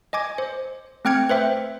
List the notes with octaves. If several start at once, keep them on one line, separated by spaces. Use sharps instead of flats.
D#5 G#5 D6 G#6
C5
A3 C4 G5 F6 G#6 C#7
B4 C5 E5 G5